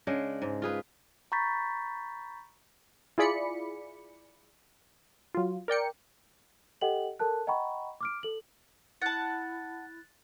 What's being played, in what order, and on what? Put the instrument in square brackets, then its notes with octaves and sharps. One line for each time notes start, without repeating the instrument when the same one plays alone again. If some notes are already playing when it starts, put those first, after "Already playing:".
[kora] C#3 G#3 D4
G#2
F4 G#4 B4
[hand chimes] A#5 B5 C#6 G6 A6 B6
[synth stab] E4 F4 G#4 D5 B5 C#7
F#3 F4
A#4 D5 G5 C#7
[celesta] G4 A4 D#5 F#5 G5 F#7
A4 A#4 A5 F#6
D#5 F#5 G5 A#5 B5 C#6
D6 F6 D7
A4 F#7
[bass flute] E4 [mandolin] F#5 A5 [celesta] F#6 A6